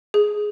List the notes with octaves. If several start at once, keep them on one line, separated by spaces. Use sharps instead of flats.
G#4